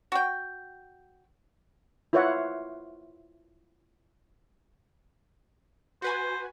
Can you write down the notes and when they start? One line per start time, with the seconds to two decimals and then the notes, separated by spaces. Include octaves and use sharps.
0.12 F#4 G5
2.13 E4 F4 B4 C#5 E5 F#5
6.02 F#4 B4 C5 G#5